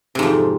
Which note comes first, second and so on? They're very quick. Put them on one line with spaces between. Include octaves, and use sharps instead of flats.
C3 G#2 F2